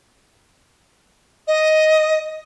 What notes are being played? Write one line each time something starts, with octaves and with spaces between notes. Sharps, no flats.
D#5